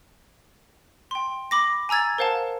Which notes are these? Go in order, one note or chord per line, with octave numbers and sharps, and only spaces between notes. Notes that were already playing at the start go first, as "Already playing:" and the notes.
G5 C6
B5 D6 A#6
G#5 A#5 E6 G#6 A6
A#4 C5 F5 F#5 A5